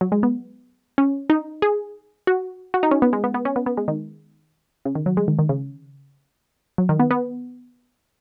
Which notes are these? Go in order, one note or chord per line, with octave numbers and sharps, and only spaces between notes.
F#3
G#3
B3
C#4
D#4
G#4
F#4
F#4
D#4
C#4
B3
G#3
B3
B3
C#4
B3
B3
G#3
D#3
C#3
D#3
F#3
G#3
D#3
D#3
C#3
F#3
D#3
B3
B3